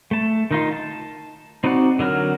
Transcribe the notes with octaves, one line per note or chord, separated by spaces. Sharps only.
A3 A5
D#3 D#4 F4
A5
C4 D#4 F#4 D5 F#5
D3 F#3 A#4 F6